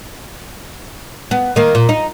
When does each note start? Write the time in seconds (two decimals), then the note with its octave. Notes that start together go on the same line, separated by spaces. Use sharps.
1.31 B3
1.56 D#3 A#3
1.75 A#2
1.89 D#4